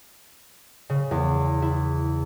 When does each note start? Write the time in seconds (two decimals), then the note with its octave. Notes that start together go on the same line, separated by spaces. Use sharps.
0.90 C#3
1.11 E2
1.62 E4